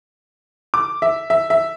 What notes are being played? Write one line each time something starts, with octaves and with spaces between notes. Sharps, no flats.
D6
E5
E5
E5